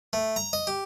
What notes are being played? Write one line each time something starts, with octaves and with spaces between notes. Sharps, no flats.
A3
A#5
D#5
G4